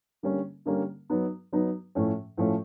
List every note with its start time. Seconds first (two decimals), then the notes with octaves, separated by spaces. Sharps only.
0.23 D3 G3 A#3 C#4
0.66 D3 G3 A#3 C#4
1.10 F#3 B3 D#4
1.52 F#3 B3 D#4
1.95 A2 F3 A3 C#4
2.37 A2 F3 A3 C#4